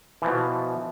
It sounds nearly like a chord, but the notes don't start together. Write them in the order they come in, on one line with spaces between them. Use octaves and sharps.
E3 F3 B2